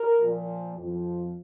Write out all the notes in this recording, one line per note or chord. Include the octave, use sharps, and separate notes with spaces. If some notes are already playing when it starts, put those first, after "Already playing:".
Already playing: A#4
A#2 F3
F2
F3